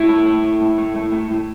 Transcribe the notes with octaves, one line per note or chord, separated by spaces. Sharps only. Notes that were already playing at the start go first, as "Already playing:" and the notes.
Already playing: A2 E4
A3
A3
A2
A2
A3
A3
A2
A2